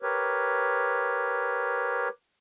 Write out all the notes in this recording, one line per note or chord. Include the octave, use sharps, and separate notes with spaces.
G4 A#4 B4 C#5